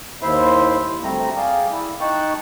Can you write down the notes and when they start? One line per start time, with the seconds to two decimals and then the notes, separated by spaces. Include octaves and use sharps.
0.22 D#2 E4 C5 E5 C6
1.04 D2 G3 A3 C4 A#5
1.37 G#4 D5 F5 G5
1.72 E4
2.01 D#4 G5 A5 C#6 F#6